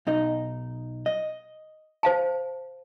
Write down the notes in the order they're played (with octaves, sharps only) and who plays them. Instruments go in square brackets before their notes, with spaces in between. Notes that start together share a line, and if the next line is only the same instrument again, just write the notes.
[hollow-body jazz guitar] B1 D#4 D#5
D#5
[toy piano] C5 F5 A5